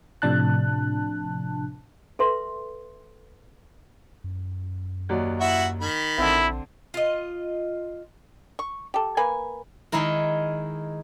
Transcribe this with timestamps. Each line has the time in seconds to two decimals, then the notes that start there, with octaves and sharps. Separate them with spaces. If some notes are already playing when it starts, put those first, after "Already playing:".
0.22 A2 C3 F3 D4 A5 F#6
2.19 A4 B4 E5 C6
4.24 F#2
5.09 D#2 F#3 D5
5.41 E4 F#4 E5
5.81 D#3 B5
6.18 A#1 D3 C4 E4
6.94 F4 D#5
8.59 C#6
8.94 G4 A4
9.17 A#3 B4 G#5
9.92 D#3 G#3 D#4 E4 A#4